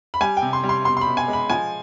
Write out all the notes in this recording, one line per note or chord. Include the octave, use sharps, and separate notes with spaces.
B5
G3 G#5
G5
C3
C6
G3
C6
B2 C6
C6
B5
B2
G#5
G#3
B5
F3 G#5